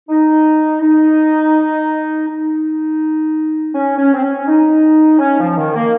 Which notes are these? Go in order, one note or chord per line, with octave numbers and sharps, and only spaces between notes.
D#4
D#4
D#4
C#4
C#4
C4
C#4
D#4
C#4
F3
D#3
A#3